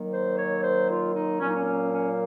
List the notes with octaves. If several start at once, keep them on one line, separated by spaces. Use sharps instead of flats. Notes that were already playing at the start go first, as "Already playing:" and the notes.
Already playing: D#3 F#3 A#3
C5
C#5
C5
F4
D#4
A#2 F#3 A#3 C#4
D#4
C#4
C#4
C#4